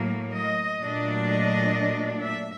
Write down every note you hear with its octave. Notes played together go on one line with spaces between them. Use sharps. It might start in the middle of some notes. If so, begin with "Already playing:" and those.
Already playing: A2 F#3 A#3
D#5
A#2 F#3 A3 D4
D#5
E5